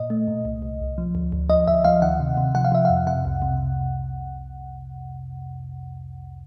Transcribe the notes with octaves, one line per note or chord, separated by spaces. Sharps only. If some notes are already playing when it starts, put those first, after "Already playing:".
Already playing: A#2 D#5
A3
A#2
C2
C2
C2
F3
D2
D2
F3 D#5
D2 E5
F3 F5
D#3 F#5
C3
C3
F3 F#5
F5
F3 E5
F2 F5
C3 F#5
C2
C3